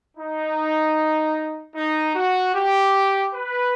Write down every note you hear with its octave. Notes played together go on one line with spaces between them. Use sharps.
D#4
D#4
F#4
G4
B4